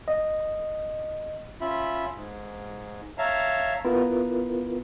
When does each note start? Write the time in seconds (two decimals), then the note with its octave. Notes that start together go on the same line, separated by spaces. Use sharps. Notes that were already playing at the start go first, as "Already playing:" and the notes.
0.08 D#5
1.61 C#4 F4 E5 B5
2.14 G#2
3.18 C#5 E5 F5 A5 A#5
3.85 B3 E4 F4 A#4 B4